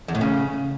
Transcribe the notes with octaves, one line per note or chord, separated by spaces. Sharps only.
E2
A2
C#3